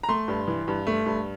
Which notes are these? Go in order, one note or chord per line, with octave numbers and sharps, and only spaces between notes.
A#5
A3 C6
G2
E3
G2
A3
G2